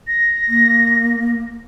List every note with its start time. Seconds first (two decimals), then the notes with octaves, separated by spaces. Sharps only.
0.07 A#6
0.48 A#3